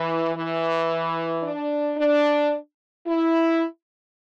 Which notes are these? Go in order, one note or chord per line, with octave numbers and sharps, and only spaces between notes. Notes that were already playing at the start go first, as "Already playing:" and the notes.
Already playing: E3
E3
D4
D4
E4